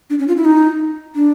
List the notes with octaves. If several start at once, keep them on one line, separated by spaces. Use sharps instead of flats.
D4
C#4
F4
E4
D#4
D4